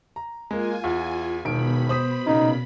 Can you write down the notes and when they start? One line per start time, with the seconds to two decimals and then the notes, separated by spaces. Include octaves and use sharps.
0.16 A#5
0.51 G#3 A#3 F4 G#5
0.84 E2
1.45 E1 B2 D#3 B5 D7
1.89 C5 D#6 B6
2.27 A#2 C#3 D#4